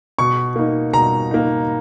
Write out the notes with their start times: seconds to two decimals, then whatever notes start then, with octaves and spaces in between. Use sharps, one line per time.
0.18 B2 C#6
0.56 A#3 D#4
0.93 B2 A#5
1.31 A#3 D#4